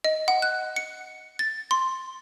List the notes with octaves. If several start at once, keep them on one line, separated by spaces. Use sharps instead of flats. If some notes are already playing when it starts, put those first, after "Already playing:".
D#5
F#5
F#6
C#7
A6
C6